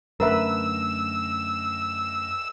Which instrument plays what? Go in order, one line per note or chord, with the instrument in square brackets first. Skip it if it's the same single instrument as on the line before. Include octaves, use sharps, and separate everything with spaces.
[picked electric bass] F#2 D3 A3 [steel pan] A#4 B4 E5 [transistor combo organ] E6